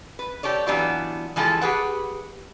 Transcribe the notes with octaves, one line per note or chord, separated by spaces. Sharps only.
B4
G4 A4 C#5 D5
E3 F#3 G3 B3 D4 F4
E3 F3 G#3 F4 G4 A4
G4 G#4 B4 F#5